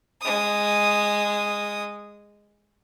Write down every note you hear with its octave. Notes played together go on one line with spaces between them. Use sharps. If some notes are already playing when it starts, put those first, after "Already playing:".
G#3 D#6